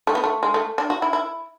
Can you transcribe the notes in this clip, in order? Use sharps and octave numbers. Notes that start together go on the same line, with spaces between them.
A3
B3
A3
G#3
A3
D4
F#4
E4
E4